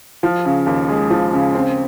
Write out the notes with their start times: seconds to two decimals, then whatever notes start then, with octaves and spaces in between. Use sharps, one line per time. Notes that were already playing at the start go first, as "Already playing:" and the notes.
0.23 F3
0.45 C#3
0.66 D#2
0.89 G#3
1.10 F3
1.33 C#3
1.55 C4